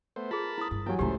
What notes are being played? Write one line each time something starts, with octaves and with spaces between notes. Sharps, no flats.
A3 B3 C5
F4 G#4 A#4 A5 B5
E4 D#6
G2
E3 F#3 A#3 E4 G4 G5 G#5
C#2 A2 A3 C#4 E4 G4 C5